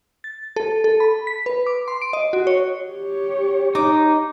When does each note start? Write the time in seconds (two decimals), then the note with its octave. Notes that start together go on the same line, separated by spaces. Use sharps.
0.24 A6
0.56 A4
0.84 A4
1.00 B5
1.27 B6
1.46 B4
1.66 D6
1.88 C6
2.02 D7
2.13 D#5
2.33 F#4
2.47 C#5
2.90 G4 C#5
3.75 D#4 D6